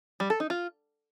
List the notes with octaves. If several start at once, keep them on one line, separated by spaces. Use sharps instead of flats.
G3
A4
D#4
F4